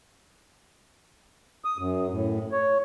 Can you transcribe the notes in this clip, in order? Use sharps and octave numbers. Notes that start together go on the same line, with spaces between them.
D#6
F#2
A2
C#5